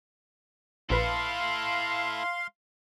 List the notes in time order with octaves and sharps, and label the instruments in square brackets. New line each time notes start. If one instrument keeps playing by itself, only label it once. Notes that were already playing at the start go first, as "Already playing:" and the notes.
[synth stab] A#1 B4 [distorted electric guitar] E4 A4 [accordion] F5 C6